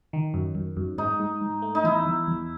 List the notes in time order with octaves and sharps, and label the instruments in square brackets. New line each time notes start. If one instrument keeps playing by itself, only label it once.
[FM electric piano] D#3
F#2
F#2
F#2
[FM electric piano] G#2 [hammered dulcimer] D#4
[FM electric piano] G#2
G#2
A3
[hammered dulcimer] D#4
[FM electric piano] E2 [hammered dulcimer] E4
[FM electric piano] E2
E2